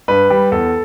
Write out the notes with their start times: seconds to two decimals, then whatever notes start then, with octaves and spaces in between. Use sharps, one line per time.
0.08 G2 B4
0.30 G3
0.52 E2 A4